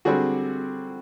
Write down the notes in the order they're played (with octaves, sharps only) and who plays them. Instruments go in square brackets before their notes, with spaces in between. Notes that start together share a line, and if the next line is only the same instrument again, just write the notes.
[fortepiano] D3 G3 C4 F#4 G#4